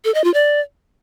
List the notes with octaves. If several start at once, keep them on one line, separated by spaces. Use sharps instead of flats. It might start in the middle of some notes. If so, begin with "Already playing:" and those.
A4
D#5
F4
D5